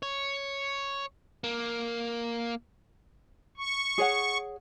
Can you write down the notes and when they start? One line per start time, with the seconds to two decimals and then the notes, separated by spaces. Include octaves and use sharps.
0.03 C#5
1.44 A#3
3.57 C#6
3.98 G#4 C#5 F#5